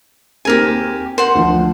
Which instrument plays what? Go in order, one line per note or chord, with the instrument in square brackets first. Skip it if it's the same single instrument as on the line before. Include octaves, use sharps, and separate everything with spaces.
[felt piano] D#2 C4 G#4 [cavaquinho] G4 A#4 G#5
[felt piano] A#4 [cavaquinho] C5 F#5
[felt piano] D2 F3